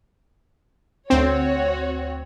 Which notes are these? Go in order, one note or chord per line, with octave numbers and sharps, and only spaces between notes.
D2 C4 F#4 C#5